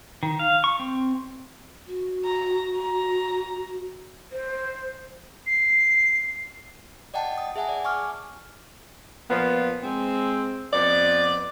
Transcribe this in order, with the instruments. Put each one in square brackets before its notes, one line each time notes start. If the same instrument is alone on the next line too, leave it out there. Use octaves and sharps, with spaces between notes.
[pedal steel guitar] D#3
F5
C#6
C4
[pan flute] F#4
[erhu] A#5
A#5
[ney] C5
[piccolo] C7
[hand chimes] D5 D#5 F#5 G5 A5
D#6
G#4 E5 F#5 G#5 A5
D5
G#5 C#6 D6 F6
[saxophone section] A#2 F3 B3
G#3 C4
F2 B3 D5